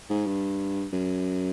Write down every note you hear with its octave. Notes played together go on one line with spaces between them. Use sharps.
G#2
G2
F#2